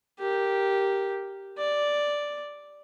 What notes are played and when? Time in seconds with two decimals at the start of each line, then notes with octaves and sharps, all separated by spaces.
0.19 G4 A#4
1.58 D5